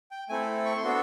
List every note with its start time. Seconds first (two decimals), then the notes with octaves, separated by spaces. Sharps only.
0.11 G5
0.29 A3 C4 E4 A4 G#5
0.65 C#6
0.77 C6
0.84 B3 D4 F#4 A4